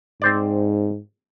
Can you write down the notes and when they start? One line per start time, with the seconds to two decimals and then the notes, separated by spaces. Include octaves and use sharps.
0.22 G#2 C4 C5 D5